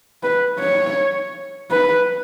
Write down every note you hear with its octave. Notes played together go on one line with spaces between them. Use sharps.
B4
C#5
B4